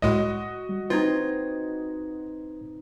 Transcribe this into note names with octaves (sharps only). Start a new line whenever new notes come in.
C2 A2 G#3 F#4 D#5
G3
C4 D#4 F4 B4 G#6